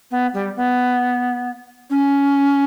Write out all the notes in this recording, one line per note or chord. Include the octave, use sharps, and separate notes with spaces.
B3
G3
B3
C#4